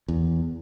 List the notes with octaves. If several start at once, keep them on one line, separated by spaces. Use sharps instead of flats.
E2